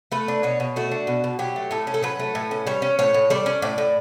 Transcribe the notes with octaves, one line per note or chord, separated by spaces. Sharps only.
A3 B4
D4
B2 C#5
B2
A3 F#4
D4
B2
B2
F#3 G4
A3
A2 A4
C#4
A4
F#3 B4
A3
A2
C#4
G3 C#5
C#4
A2 C#5
A2
G3 D5
C#4
A2 D5
A2